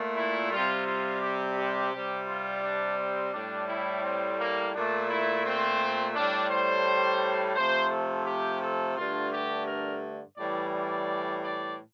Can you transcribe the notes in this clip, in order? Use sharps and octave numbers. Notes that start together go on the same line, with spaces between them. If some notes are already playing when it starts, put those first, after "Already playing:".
Already playing: A#2 A3
E4
C3 G3 F4
F4
G4
G4
C3
G3
F4
D4
C4
A2 G3 D4
E4
C4
A#3
A#2 A3 D4
E4
C4
A2 G3 D4
C5
C3 F3 A3 C5
A4
G4
A4
G2 D3 A3 F4
G4
A#4
A2 E3 G3 D5
D5
D5